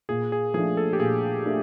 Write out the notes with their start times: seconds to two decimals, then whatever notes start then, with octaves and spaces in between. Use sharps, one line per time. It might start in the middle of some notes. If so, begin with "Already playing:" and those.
0.09 A#2 G#4
0.32 G#4
0.54 F3 A3 D4 G#4
0.77 A4
0.93 G4
0.99 A#2 G#4
1.45 A3 D4